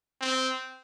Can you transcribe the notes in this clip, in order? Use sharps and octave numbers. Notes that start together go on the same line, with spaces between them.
C4